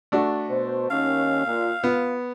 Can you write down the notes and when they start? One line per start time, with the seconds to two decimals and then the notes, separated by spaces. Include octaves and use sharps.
0.12 A3 D4 F#4
0.49 B2 C5
0.90 D#2 D#3 C#4 F5
1.46 A#2
1.84 B3 F4